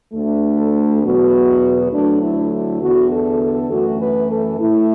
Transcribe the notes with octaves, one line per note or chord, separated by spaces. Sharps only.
D2 D3 A3
A4
E2 B2 F#3 B3 F#4
D2 D3 F#3 A3 D4
E4
E4
E2 D3 B3 F#4
A4
A4
F#2 E3 A3 F#4
B4
A4
A2 A3 E4